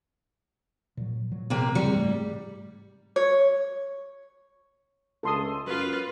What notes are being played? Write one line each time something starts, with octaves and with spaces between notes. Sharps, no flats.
A#2 F#3
A#2 F#3
C3 A#3
C#3 G3
G#2 A3
C#5
C#2 A4 C6 D#6
F#2 F4 B4